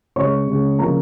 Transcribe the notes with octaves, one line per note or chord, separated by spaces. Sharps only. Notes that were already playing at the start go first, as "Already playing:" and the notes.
C#3 G#3 C#5 C#6
C#3 G#3
C#3 F3 A#3 A#4 A#5